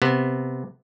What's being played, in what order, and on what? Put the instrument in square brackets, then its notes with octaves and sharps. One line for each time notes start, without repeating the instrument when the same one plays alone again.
[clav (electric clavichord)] C3 B3